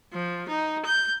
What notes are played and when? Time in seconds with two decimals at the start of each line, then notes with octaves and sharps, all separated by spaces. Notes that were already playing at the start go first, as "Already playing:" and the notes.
0.12 F3
0.48 D#4
0.84 G6